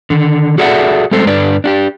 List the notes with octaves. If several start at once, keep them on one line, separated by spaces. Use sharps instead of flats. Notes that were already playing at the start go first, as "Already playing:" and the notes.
D3 D#3
F#4 G#4 A4 D5 E5 F#5
G3 G#3 C4 A4 C5
G2 D3 D4 B4 D5
D4 F#4 G4